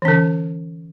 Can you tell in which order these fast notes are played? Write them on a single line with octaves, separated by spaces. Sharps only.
E3 C#4 D3